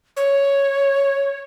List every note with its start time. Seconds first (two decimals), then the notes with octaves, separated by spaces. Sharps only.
0.17 C#5